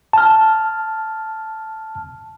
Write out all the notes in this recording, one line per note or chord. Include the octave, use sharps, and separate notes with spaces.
A5 F6